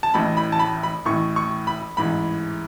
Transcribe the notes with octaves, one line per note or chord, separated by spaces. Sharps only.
A5
A1 A2 E3 B5
B5
A5
B5
B5
A1 A2 E3 C#6
C#6
B5
A1 G#2 E3 B5